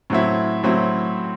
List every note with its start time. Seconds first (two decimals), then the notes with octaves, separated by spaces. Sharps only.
0.10 A2 F#3 C4 E4
0.63 A2 F#3 C4 E4